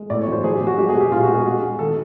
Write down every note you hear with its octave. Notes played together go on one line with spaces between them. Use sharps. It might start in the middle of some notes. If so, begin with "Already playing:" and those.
Already playing: G#3
A2 D5
C#5
F#3 C5
F#3 G#4
G4
F#3
F#4
G#3 G4
G#4
B2
G4
A#2 F4
F#4
G#3
G#4
G#3
G#3
D#3 A4